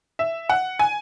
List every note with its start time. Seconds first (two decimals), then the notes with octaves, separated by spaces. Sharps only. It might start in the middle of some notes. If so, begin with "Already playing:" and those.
0.19 E5
0.49 F#5
0.79 G#5